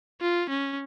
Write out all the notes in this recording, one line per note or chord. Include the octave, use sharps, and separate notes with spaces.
F4
C#4